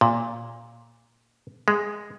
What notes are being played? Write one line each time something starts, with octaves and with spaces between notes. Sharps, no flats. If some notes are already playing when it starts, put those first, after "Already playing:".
A#2
G#3